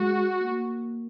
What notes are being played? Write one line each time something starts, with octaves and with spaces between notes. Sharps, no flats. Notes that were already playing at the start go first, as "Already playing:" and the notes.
Already playing: G#3 F#4
A#3